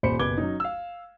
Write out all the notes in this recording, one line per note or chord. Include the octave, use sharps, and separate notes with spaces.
D#1 C5 B5 C#7
F#1 B2 B4 D6 G#6 G7
F#3 C#4 D#4
F5 E6